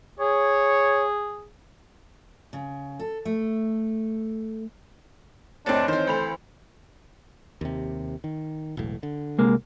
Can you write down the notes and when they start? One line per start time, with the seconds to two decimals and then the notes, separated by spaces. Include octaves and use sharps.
0.20 G#4 C#5
2.53 C#3
3.00 A4
3.25 A3
5.66 F#1 A2 C4 D4 C5 C#5 D#5 A5
5.88 D#3 E3 C4 C5
6.07 D2 A4 B5 F7
7.61 D#2 C3
8.24 D#3
8.77 E1 B1 A2
9.03 D3
9.38 C2 G#3 A#3